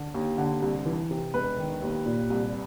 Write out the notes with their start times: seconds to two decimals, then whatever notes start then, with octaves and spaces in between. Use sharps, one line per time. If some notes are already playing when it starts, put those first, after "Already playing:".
Already playing: D3
0.15 D#2
0.38 D3
0.62 C2
0.86 E3
1.11 C3
1.34 E1 B4
1.58 D#3
1.82 D#2
2.06 A#2
2.30 C2